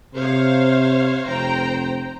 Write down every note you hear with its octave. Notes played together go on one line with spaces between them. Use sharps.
C3 C5 C#5 F5
F1 C5 G5 A#5